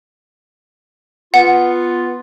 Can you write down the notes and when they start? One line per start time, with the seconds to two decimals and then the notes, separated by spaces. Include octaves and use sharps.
1.34 B3 F4 F#5